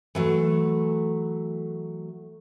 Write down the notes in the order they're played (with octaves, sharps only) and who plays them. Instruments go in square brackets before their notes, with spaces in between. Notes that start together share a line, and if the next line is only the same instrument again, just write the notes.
[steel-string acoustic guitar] E3 F#3 A3